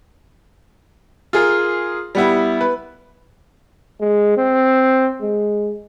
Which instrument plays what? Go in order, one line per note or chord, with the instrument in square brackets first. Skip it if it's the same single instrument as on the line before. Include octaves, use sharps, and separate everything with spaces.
[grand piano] F4 G#4 A#4
G3 B3 E4
B4
[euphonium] G#3
C4
G#3